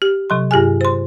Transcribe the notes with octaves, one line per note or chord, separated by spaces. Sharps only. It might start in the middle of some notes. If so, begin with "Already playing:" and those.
G4
C3 F#3 C6
G2 G4 G#4 G#5
C5 C6